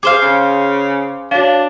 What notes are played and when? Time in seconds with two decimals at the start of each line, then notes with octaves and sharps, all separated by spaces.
0.03 G#4 C5 F5 D6
0.22 C#3
1.31 D4 F#4 C#5 F5